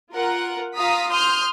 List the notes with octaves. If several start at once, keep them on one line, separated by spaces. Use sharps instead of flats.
F4 A#4 F#5
F4 F5 A#5 D#6 B6
C6 D#6 F6 G6